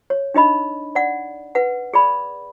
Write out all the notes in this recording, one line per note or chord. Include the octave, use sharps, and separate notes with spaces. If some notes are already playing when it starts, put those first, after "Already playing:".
C#5
D4 D#4 D#5 B5
D5 F#5
B4 F#5
G#4 D5 B5